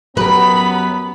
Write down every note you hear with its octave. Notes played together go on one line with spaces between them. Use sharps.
F#2 F#3 B3 G4 A#4 B4 B5